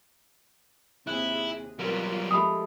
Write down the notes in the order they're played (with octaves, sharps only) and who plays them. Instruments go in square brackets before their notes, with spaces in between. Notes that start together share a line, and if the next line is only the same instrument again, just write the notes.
[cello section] D#2 C3 G#4 [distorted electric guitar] E4 [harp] F#6
[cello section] B2 C4 F4 [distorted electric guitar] F#3 G3 [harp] A#4
[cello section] F3 [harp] G#3 A3 G4 [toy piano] B5 D#6